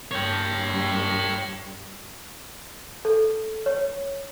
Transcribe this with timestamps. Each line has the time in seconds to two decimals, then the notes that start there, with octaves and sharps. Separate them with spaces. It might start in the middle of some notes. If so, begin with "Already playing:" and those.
0.11 G2 C#5 G5
3.05 A4
3.66 C#5